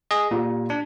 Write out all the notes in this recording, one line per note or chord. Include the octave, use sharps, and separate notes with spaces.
G#4 D#5
A#2 F4 G4
D4